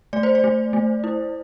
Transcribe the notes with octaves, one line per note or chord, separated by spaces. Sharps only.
A3 D5
C5
D5
A3
A3
E4